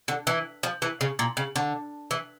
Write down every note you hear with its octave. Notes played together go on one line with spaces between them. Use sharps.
D3
E3
F3
E3
C#3
A#2
C#3
D3
E3